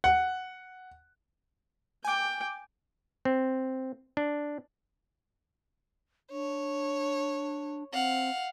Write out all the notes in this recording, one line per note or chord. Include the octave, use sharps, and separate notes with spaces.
F#5
G5 G#5 D6
C4
D4
D4 C#5
C4 F5 F#5